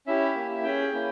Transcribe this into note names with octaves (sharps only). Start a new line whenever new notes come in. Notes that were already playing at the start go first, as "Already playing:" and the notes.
C#4 E4 G4 E5
A#3 E4 G4
C#4 G#4 G5
A#3 C#4 E4